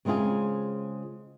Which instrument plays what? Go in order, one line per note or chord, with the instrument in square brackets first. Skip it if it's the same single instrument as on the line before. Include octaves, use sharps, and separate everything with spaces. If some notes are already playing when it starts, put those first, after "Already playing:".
[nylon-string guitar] C#3 G#3 C4 F4 G#4